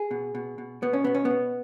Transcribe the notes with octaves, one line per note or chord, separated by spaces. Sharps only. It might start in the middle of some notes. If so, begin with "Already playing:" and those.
Already playing: G#4
B2
B2
B2
B2 B3
C#4
B2 B3
C#4
B3
B2